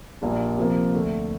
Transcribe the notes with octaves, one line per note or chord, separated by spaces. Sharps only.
A#1 A#2 G3 A#3 D4
C3 F3 A#3
D2 D3 A3